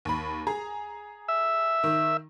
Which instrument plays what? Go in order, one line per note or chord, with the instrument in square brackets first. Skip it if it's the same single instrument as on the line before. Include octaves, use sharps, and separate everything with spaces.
[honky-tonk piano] D#2 B5
G#4 A#5
[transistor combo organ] E5
[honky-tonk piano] D#3